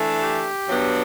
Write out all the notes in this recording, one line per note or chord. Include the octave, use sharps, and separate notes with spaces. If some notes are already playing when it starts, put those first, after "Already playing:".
Already playing: E3 A3 D4
G4
G2 F#3 B3 D4